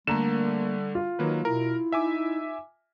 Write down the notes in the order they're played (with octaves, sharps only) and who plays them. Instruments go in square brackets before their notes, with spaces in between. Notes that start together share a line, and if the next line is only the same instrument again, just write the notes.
[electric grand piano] D3 A3 [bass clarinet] G3 [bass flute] A#3 [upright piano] A#5 E7
[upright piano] F4
[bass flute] D#3 [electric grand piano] F#3 A#3 B4
[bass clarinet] B2 [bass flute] E4 [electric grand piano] A#4
[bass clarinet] D#4 [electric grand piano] E5 G#5 D6